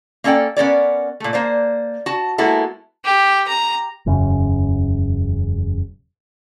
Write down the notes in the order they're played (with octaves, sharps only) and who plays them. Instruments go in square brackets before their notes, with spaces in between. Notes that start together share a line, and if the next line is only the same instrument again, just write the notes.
[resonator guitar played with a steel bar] A#3 C#4 A4 D5 G5
B3 C#4 A#4 D5
A#2 A3
A#3 C5 D5
F#4 A5
G#3 A#3 B3 E4 F#4 A4
[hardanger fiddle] G4
A#5
[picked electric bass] E1 F#2 C#3